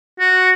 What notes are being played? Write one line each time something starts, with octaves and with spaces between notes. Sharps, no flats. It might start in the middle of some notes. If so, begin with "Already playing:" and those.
F#4